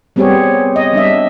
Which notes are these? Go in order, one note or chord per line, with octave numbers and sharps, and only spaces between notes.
G3 B3 C4 G4 G#4 C#5
D#5
G3 D4 E5